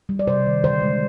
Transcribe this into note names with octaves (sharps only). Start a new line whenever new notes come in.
G3
D5
C3 C5
D#3
D3 C5
G#3